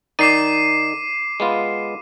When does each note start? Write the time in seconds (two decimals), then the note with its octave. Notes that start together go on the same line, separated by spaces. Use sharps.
0.19 D#3 D#4 D5 D6 C7 D#7
1.40 G#3 B3 F4